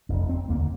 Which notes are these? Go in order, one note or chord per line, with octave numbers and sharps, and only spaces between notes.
F1 C4
C4
D#2 D3 A#3